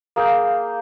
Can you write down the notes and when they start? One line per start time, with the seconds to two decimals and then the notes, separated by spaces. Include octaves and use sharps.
0.16 A#3 G#4 G5